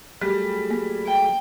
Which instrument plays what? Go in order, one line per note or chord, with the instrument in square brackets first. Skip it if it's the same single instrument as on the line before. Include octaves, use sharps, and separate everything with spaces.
[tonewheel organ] F#3 A3 G#4 [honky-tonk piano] G3
[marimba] A#3
[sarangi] G5